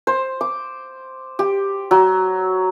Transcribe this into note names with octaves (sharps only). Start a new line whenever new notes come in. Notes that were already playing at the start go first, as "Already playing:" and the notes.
C5
D6
G4
F#3